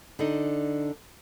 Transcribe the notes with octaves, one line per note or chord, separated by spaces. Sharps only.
D3 D4 D#4